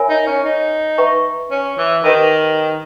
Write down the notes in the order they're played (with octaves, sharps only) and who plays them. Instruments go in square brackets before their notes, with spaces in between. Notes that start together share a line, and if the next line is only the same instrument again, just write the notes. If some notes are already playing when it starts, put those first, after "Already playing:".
Already playing: [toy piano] A#4 C#5 E5 G#5 B5
[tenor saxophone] D#4
C#4
D#4
[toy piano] B4 E5 G5 A#5 C#6
[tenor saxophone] C#4
E3
[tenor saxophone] D#3 [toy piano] G4 B4 D#5 G5 B5